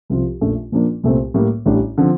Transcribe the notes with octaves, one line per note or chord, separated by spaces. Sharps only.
C2 C3 F3 C4 F4
A#1 A#2 A3 D4
A#2 F3 A#3 D4
C2 A#2 A3 C4
A2 G3 A#3
A1 A2 G3 D4
D3 F3 C4